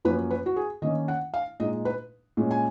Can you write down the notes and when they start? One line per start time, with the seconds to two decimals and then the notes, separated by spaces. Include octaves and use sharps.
0.05 F#2 F3 A#3 C#4 B4
0.30 B4
0.46 F#4
0.56 G#4
0.82 D#3 A#3 C#4 D#5
1.08 F#5
1.34 F5
1.60 A#2 G#3 D#4 D#5
1.85 B4
2.37 A#2 G#3 C#4
2.51 G#5